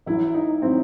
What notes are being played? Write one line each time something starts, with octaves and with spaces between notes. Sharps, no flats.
A1 A2 F#3 E4
D#4
A2 F#3 C4